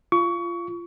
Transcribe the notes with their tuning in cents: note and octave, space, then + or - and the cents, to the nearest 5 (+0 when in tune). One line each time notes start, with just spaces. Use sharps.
F4 -20 C#6 +25